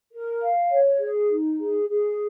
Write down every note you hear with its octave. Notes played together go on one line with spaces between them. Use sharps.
A#4
F5
C#5
G#4
D#4
G#4
G#4